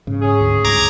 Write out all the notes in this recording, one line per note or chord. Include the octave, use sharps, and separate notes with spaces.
G#2 C#3
C#4 G#4
D2
C#2 G2 A#5 D6 G#6